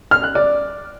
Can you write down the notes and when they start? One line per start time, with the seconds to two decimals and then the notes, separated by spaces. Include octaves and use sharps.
0.11 F6
0.23 F#6
0.35 D5